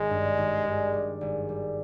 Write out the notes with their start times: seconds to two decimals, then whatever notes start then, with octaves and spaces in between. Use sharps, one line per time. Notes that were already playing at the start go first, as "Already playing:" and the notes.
Already playing: G#1 G#3
0.10 G2
0.38 G#1
0.65 G2
0.94 G3
1.21 G#1
1.49 G3